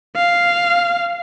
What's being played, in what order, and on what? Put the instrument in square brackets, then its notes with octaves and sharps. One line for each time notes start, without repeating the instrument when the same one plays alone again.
[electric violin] F5